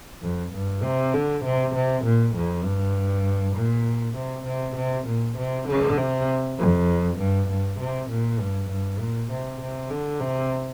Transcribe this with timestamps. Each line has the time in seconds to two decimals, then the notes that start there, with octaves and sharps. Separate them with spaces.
0.22 F2
0.53 G2
0.83 C3
1.13 D3
1.44 C3
1.74 C3
2.04 A#2
2.35 F2
2.64 G2
3.56 A#2
4.16 C3
4.46 C3
4.76 C3
5.07 A#2
5.37 C3
5.68 D3
5.98 C3
6.58 F2
7.18 G2
7.49 G2
7.79 C3
8.10 A#2
8.40 G2
8.70 G2
8.99 A#2
9.31 C3
9.61 C3
9.90 D3
10.20 C3